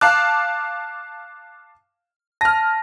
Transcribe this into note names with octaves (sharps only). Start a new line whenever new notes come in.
F5 A5 D6 F#6
A5 F6 A#6